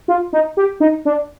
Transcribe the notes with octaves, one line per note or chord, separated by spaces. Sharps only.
F4
D#4
G4
D#4
D4